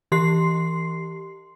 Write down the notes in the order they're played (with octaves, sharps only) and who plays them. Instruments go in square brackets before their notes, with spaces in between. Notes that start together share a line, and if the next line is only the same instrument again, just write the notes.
[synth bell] E3 G4 C6 C7